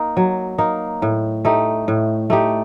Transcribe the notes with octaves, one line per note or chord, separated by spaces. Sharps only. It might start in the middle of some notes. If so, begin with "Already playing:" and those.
Already playing: A#3 D#4
F#3
A#3 D#4
A2
A3 D#4 G4
A2
A3 D#4 G4